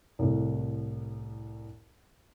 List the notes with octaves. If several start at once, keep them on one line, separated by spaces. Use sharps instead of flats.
C2 A2